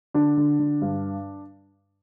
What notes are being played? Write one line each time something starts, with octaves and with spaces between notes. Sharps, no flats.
D3 D4
D3
D3
G2